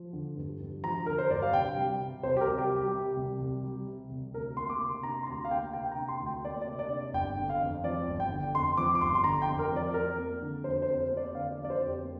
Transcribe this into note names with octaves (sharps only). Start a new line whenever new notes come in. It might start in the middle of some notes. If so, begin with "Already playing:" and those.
Already playing: F3
D3
G2
G2
F3 A#5
D3 A#4
C5
G2 D5
F5
C2 G5
G3
C3
C2 C5
G4
A#4
C2
G4
G3
G4
C3
C2
C2
G3
C3
C2
D2 A#4
A#3 C6
D6
C3 C6
D4 A#5
C6
D2 A#5
F5
A#3 G5
C3 G5
G5
A#5
D4
C6
D2
G5
A#3 D5
D5
C3
D5
D4
D5
G1 G5
D3
F5
F2
F3 D5
G1
G5
D3
F2 C6
F3 D6
D6
G1 C6
C6
D3 A#5
G5
F2
A#4
F3 D5
F2 A#4
A#3
D3
F2 C5
C5
F2
C5
A#3
D5
D3 F5
D5
F2
D5
C5
F2
G4
A#3